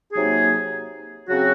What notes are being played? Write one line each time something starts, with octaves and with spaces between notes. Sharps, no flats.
C3 F#3 A#3 D#4 G#4
C#3 F#3 C4 F#4